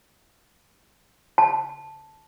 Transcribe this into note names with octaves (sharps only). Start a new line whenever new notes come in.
A5